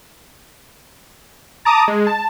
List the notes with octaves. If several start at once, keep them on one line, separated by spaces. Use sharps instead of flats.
A5 A#5 D6 D#6
G#3
A5